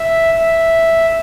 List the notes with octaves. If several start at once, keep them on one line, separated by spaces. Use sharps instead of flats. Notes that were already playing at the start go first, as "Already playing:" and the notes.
Already playing: E5
E5